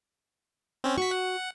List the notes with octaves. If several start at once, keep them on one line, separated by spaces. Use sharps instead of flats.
C4 C#4
F#4 C#6 B6
F#5